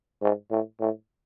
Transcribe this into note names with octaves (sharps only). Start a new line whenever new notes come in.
G#2
A2
A2